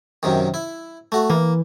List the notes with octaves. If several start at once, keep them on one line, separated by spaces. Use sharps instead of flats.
F#2 C3 D#3
E4
A3 F#4
E3 A#3